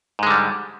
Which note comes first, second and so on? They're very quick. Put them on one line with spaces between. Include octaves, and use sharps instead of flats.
G#2 G#3 D3 G3